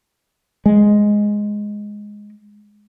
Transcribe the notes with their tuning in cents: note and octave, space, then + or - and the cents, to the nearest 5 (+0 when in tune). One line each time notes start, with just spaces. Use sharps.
G#3 +0